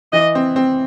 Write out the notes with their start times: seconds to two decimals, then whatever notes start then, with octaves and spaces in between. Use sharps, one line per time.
0.13 E3 D#5
0.35 C4
0.56 C4